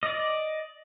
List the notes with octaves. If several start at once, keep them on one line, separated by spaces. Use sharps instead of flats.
D5 D#5